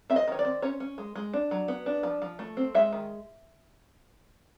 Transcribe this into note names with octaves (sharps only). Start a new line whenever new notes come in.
C4 E5
D#5
D#3 C#5
D5
C4
C#4 C#5
C#4
G#3
G#3
D4
F#3
B3
D4
F3
F3
A3
C4
G#3 E5
D#3